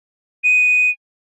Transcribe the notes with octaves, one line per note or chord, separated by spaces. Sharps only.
D#7